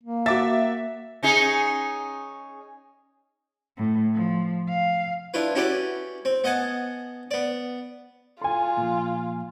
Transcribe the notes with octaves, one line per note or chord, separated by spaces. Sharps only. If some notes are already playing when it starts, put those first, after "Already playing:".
A#3
F#4 E5 D6 A6
C#4 D#4 G#4
A2
F3
F5
D4 E4 F4 B4
C#4 E4 F#4 G4 B4 D5
C4
B3 D#5 F#5 G#5 A5
B3 D5
F4 A4 G#5 C6
A#2 F3